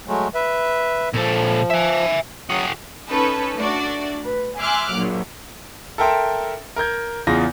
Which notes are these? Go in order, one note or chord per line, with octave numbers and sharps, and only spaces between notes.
F#3 G#3 A3
B4 E5
A#2 F3 A4
E5 G#5
F#3 F#4 G#4 D#6
C#4 D#4 A4 B4
A3 D4 F#4 D5
B4
E5 G#5 C6 D6 F6 F#6
A#1 A#2 F#3
A4 A#4 E5 G5 C6 E6
A#4 A#5 G6 G#6
E2 C#3 F4 A#6